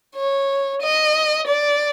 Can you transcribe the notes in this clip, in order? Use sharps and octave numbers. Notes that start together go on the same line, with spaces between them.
C#5
D#5
D5